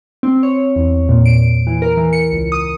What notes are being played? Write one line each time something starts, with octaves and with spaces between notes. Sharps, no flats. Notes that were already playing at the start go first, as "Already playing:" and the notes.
C4
C#5
E2
A#2
D7
E3
A#4
E3
C#7
C#2
D#6